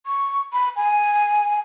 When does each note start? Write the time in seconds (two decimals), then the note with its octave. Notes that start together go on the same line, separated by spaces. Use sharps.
0.06 C#6
0.53 B5
0.76 G#5